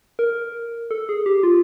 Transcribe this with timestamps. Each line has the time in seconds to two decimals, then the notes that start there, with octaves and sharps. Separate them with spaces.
0.19 A#4
0.91 A4
1.09 G#4
1.26 G4
1.43 F4